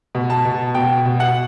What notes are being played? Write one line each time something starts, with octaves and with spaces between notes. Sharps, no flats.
B2
A5
B2
B2 G5
B2
F#5